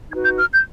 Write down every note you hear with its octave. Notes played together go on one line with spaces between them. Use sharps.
D#4 F#4 B4 G#6
G6
F6
G6